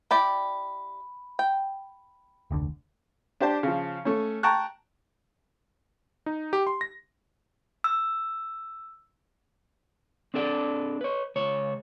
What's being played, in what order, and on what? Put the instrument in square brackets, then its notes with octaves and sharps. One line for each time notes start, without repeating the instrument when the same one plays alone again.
[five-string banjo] E4 G4 D5 [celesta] B5
[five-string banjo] G5
[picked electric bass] F1 D2 D3
[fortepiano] D4 G4 C5 A5
C#3 F3
A3 C#4
G5 A5 A#5 C#6 F#6
[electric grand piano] D#4
G4
C6
A#6
[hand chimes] E6
[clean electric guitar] C4 D4 A4 D5
B4 C#5
C#2 C#5